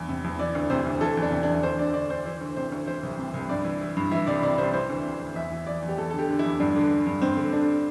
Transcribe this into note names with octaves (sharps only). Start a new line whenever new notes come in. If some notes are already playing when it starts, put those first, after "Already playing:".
Already playing: E2 G2 E3
C3
E2
E3 D5
D2
C3 C5
D2
E3 A4
E2
D4
C3
E2 D4
D2 C5
D3 D5
D3 D5
D2 C5
E3 C5
D2
C3 C5
D2
E3 C5
C2
C3
C2
G2 D5
E3
E3
G2
E3 E5
C2 D5
C3 D5
C2 C5
E3 C5
D2
C3
D2
E2 E5
E3
E3 D5
E2
G4
E2 A4
A4
D3
G4
D3
E4
E2
G2 D4
D3
D3
G2
G2 C4
D3
D3 D4